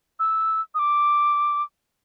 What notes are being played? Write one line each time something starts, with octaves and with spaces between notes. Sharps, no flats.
E6
D#6
D6